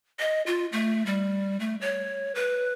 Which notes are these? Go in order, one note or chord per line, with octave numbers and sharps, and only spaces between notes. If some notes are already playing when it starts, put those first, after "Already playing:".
D#5
F4
A3
G3
A3
C#5
B4